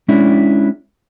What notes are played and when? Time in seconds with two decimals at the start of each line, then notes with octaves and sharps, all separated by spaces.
0.08 G#3 C#4 D4 E4